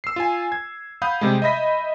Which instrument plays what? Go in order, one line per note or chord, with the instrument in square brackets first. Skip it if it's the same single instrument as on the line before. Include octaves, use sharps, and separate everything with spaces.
[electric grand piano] E6 C7
F4 G#5
G#6
F5 F#5 B5 D#6 G6
C3 G3 G#3
D#5 E5 B5 A#6 B6